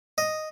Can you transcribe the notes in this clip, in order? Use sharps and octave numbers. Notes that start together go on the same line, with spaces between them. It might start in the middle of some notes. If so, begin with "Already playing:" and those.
D#5